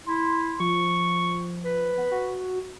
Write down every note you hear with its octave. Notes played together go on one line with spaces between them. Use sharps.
E4 C6
F3 C#6
B4
B3
F#4